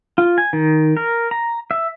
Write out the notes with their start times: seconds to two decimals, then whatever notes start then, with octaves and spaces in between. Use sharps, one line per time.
0.18 F4
0.38 G#5
0.53 D#3
0.97 A#4
1.31 A#5
1.71 E5